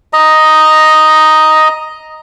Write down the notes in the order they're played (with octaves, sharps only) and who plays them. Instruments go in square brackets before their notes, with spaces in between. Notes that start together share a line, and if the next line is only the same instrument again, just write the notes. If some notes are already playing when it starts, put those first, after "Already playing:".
[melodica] D#5 A#5